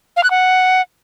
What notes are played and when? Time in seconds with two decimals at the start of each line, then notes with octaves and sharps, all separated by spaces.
0.16 F5
0.23 F#6
0.30 F#5